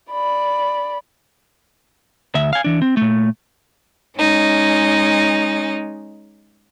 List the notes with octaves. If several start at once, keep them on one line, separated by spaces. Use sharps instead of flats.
D5 B5
D2 E5
F5 G#5
E3 D4
C4
A#2 A3
G#3 C#4 D#4